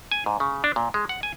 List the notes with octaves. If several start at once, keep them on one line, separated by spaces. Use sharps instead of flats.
G#5
G#2
C#3
D4
A#2
G#3
F#5
G#5